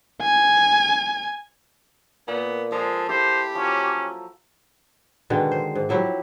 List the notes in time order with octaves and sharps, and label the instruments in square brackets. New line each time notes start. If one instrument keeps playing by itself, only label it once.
[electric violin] G#5
[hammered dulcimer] A#2 [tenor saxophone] B3
[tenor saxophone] F3 [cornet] G#3 [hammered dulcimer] A4
[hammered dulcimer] E4 A4 [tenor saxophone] G4 [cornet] C5
[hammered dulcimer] F3 F#3 [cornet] C#4
[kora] B2 D3 D#3 G#3
C5
G#2
F3 F#3 E4 G4